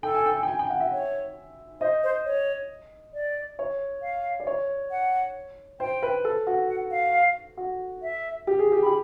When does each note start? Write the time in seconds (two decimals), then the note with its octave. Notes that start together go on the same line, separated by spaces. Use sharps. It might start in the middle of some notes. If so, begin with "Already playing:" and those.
0.03 A4 G5
0.14 G#5
0.26 G5
0.37 G#5
0.43 G5
0.48 G#5
0.59 G5
0.70 F#5
0.80 E5
0.93 C#5
1.81 C5 D#5
2.03 C5
2.25 C#5
3.14 D5
3.59 C#5
4.02 F5
4.40 D5
4.47 C#5
4.91 F#5
5.80 C5 G5
6.02 B4
6.25 A4
6.47 F#4
6.69 F#5
6.91 F5
7.57 F#4
8.02 E5
8.47 G4
8.59 G#4
8.72 G4
8.82 B5
8.86 G4